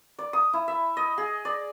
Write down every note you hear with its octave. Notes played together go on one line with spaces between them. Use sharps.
D5
D#6
E4
E5
D#5
G#4
D5